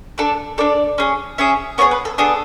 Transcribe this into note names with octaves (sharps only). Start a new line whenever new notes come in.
D4 A4 D5
D4 A4 D5
C#4 G#4
C#4 G#4 E5
B3 D4 G#4 C#5
B4
A4
B3 D4 G#4 A4